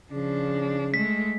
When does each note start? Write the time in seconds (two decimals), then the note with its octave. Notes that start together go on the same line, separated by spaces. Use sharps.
0.12 C#3 F3 D4
0.94 G#3 A3 B6